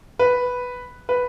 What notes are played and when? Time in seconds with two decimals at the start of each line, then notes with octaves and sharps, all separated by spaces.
0.19 B4
1.09 B4